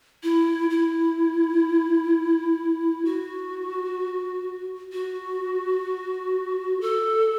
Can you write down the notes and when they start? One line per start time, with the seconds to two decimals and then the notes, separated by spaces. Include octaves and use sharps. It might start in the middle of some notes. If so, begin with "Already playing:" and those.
0.23 E4
0.70 E4
3.05 F#4
4.93 F#4
6.81 A4